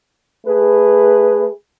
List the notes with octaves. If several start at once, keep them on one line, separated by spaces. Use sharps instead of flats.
A3 G#4 B4